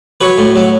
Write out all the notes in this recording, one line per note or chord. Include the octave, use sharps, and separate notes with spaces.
F#3 B4 C#5
A2
F#3